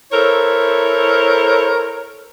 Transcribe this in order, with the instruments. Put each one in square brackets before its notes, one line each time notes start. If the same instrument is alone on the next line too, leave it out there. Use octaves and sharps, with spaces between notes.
[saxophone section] E4 A4 A#4 C5 C#5